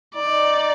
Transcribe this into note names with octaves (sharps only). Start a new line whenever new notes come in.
D#4 D5